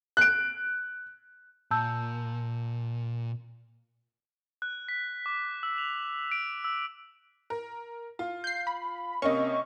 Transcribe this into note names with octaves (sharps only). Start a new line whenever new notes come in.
F#6 D7
A#2 A5 E6 G6
F#6
B6
D6
E6
F7
D7
E6
A#4
F4
G6 C7
B5
C3 A#3 C#4 D#5 C#6